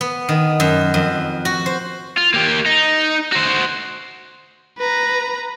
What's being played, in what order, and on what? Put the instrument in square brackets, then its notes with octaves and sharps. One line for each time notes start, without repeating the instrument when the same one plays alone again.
[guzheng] B3
D#3
F#2
F2
F#4
C5
[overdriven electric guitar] F4
A#3 G4
D#4
F#4 C5
[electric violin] B4 A#5